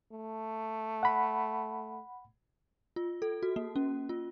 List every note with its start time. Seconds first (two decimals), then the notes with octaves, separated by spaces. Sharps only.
0.12 A3
1.03 F#5 B5
2.96 F4
3.22 A4
3.43 F#4
3.56 A#3
3.76 C#4
4.09 F4